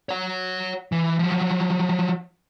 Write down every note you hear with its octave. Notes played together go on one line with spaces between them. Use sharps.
C#5 F#5
E3
F3 F#3